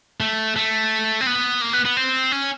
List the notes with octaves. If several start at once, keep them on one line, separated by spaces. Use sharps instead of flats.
A3
A3
C4
B3
A#3
B3
B3
C4
C#4